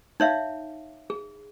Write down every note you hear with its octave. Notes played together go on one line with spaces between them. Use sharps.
D#4 C#5 E5 F5
G#4